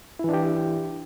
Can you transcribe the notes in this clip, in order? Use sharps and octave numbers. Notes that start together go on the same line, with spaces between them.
E3 D4 E4 G4